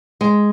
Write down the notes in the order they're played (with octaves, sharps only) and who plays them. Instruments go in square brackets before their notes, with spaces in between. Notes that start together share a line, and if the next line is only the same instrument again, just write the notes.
[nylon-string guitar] G#3